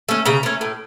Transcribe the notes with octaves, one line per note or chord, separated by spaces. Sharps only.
A3 C#4
C#3 A#5
A3 C#4
A2